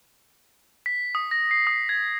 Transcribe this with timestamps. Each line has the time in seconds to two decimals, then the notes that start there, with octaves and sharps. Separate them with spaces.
0.86 B6
1.15 D#6
1.31 A#6
1.51 C7
1.67 D#6
1.89 G#6